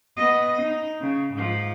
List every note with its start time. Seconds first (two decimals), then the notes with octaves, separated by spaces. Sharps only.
0.17 B3 D#5
0.62 D#4
1.01 C#3
1.34 G#2 F3